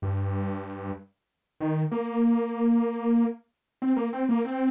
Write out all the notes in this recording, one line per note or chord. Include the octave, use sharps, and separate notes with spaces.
G2
D#3
A#3
C4
A#3
C4
A#3
C4